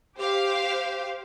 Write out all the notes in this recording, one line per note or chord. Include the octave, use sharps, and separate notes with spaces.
G4 C5 F5